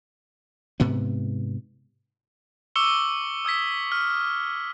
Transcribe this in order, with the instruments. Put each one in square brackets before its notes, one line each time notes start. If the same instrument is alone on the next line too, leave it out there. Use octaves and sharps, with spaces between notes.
[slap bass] G#2 C3 B3
[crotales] C#6 D6 E6 C#7 G7
D#6 E6 G#6 B6
F6